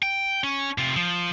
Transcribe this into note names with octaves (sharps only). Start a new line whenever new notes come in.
G5
C#4
C3 F4
F3